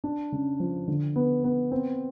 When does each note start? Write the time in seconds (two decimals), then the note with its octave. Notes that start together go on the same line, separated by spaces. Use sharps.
0.04 D4
0.32 C#3
0.60 F3
0.88 D3
1.16 B3
1.44 B3
1.72 C4